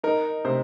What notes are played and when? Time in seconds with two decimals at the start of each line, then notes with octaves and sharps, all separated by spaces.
0.04 D#4 A#4
0.45 C3 C5